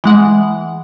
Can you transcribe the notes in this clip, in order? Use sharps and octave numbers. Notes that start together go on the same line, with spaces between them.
E3 G#3 F#5